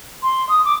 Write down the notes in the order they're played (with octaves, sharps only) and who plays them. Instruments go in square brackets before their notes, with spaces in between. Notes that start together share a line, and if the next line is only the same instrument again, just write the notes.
[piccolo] C6
D#6
D6